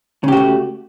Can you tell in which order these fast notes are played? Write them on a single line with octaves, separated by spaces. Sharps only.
C#3 G4 F#4 A3